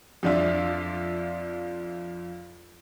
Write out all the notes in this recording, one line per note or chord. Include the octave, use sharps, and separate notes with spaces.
F2 F3 D4 F4 E5